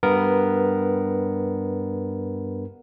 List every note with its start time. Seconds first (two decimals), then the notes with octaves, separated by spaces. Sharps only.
0.03 G2 B3 A#4